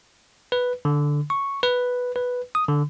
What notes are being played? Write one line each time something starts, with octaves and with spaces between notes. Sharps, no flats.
B4
D3
C#6
B4
B4
D#6
D3